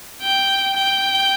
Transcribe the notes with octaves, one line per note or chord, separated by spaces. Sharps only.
G5
G5